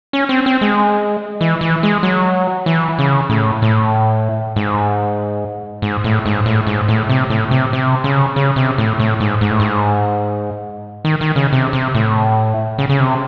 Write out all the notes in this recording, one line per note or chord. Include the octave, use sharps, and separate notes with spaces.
C#4
C4
C4
G#3
E3
E3
G#3
F#3
E3
C#3
A2
A2
G#2
G#2
A2
G#2
A2
G#2
A2
C3
A2
C3
C3
C#3
C#3
C3
A2
A2
G#2
G#2
A2
G#2
D#3
D#3
C#3
C3
C3
A2
C#3
C#3
C3